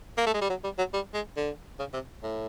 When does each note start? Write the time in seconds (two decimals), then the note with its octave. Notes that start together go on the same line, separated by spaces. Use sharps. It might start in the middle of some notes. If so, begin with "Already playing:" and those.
0.18 A#3
0.27 A3
0.34 G#3
0.41 G3
0.50 F#3
0.64 G3
0.78 F#3
0.94 G3
1.14 G#3
1.37 D3
1.80 C#3
1.94 C3
2.23 A2